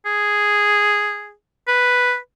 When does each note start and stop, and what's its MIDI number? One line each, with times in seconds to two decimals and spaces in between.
0.06 1.33 68
1.68 2.17 71